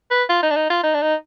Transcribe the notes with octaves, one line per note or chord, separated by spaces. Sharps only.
B4
F4
D#4
D4
D#4
F4
D#4
D4
D#4